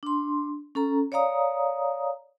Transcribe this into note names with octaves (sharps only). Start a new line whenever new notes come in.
D4 C6
C#4 A4 A#5
C#5 D5 F5 A#5 D#6